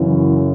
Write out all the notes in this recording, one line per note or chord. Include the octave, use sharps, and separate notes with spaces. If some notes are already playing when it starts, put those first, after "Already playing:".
Already playing: F#2 C#3 E3